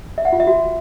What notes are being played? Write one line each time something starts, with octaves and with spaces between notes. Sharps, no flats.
E5
F#5
F4
E5
F#4